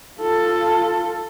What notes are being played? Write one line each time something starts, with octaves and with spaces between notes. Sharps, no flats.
F4 A4